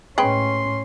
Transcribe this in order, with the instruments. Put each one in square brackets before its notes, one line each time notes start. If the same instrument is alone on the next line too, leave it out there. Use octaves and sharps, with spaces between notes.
[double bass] A2 C#4 [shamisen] G#3 B4 G5 [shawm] C6